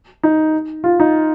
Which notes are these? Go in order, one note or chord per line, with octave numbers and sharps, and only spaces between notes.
D#4
F4
D#4